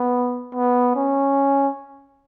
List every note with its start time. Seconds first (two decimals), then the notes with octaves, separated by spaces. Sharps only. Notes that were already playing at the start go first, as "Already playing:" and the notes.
Already playing: B3
0.55 B3
0.96 C#4